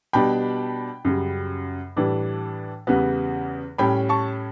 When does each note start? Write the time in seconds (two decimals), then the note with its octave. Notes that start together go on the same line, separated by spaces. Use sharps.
0.13 B2 G3 D4 G5 B5
1.05 F#2 C#3 G3
1.97 A2 E3 G3 D4
2.87 E2 C#3 E3 G3 B3
3.78 A2 G3 C#4 G5 B5
4.09 A5 C#6